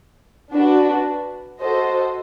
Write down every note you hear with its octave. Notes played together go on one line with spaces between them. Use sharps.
D4 F#4 B4
F#4 A4 C5 D#5